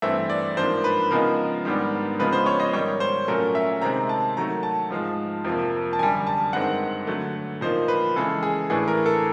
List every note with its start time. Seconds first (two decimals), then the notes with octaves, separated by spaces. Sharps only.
0.02 G2 E3 A3 C4 E5
0.30 D5
0.57 G#2 F3 A#3 D4 C5
0.84 B4
1.11 C#3 F3 G#3 B3 D#4 A#4
1.65 G#2 D#3 G3 B3 D4
2.19 C#3 F3 G#3 B3 B4
2.33 C5
2.46 C#5
2.60 D#5
2.73 G#2 D#3 G3 C#5
3.00 C5
3.28 A#2 F#3 A3 C#4 A#4
3.55 E5
3.82 C3 D#3 G#3 C4 A#5
4.09 A5
4.37 D#3 F#3 A3 A#5
4.63 A5
4.90 G#2 F3 G#3
5.44 F2 C3 F3 A#3
5.93 A5
5.99 F#2 D3 G3 G#5
6.27 A5
6.53 G2 D#3 G#3 C4 F#5
7.07 D3 F#3 A3
7.61 A#2 F3 A#3 D#4 C5
7.88 B4
8.16 C#3 E3 G#3 A4
8.43 G#4
8.70 A2 E3 A3 D4 G#4
8.88 A#4
9.06 A4